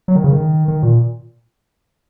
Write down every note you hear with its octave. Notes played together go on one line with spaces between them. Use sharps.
F#3
D#3
C#3
D#3
D#3
A#2